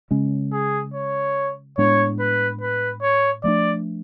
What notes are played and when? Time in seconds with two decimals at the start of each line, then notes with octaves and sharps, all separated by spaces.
0.11 C#3 G#3 C#4
0.52 G#4
0.94 C#5
1.78 A2 G#3 B3 D4 C#5
2.19 B4
2.61 B4
3.02 C#5
3.44 F3 A3 D4 D5